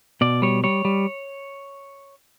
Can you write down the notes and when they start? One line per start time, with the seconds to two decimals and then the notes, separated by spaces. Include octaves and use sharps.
0.21 B2 D5
0.42 G3 C#5
0.64 G3 C#5
0.85 G3